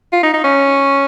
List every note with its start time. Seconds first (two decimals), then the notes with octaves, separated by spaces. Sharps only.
0.13 F4
0.23 D#4
0.34 D#4
0.44 C#4